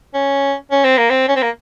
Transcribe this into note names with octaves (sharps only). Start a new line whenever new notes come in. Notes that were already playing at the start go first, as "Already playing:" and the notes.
C#4
C#4
C4
A#3
C4
C#4
C4
A#3